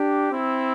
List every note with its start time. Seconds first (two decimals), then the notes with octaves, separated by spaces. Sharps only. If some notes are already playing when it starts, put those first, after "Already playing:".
Already playing: D4 G4
0.32 C4 E4